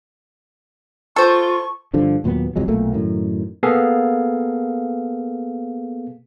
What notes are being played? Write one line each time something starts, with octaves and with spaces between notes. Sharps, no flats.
F4 A4 C5 C#6
G2 D3 F3
D#2 A#2 F#3 B3
C2 F2 F#3 G#3
B1 A#2 A3 A#3
F#2 A2 D#3
A#3 B3 G#4 A4 F5